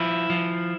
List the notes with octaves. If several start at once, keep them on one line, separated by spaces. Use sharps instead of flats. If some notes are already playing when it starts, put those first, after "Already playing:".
Already playing: F3 E4
F3